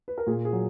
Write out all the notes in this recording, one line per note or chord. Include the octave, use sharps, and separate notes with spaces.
B4
A#4
A#2 G#4
G#4
F#3